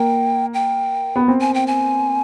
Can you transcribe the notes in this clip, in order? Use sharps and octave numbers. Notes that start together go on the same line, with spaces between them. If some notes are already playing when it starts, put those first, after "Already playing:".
Already playing: A#3 G5
G5
B3
C4
G#5
G5
G#5